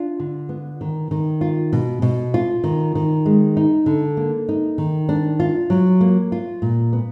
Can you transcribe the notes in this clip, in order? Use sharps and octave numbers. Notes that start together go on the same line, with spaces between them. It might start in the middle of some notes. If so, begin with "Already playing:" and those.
Already playing: D4 F4
D3
B3
D#3
D#3
F4
B2
B2
F4
D#3
D#3
G#3
D#4
D3
A#3
D#4
D#3
D4
F4
F#3
A#3
F4
A#2
B3